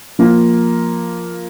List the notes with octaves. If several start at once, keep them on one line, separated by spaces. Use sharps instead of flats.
F3 A#3 F4